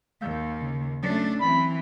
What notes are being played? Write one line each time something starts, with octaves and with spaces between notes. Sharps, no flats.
D#2 F5 E6 G6
C#3
F#3 A3 C#4 D4
E3 C4 B5